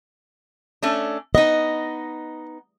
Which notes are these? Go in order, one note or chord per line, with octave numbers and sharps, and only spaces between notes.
A3 C#4 D4
B3 D#4 D#5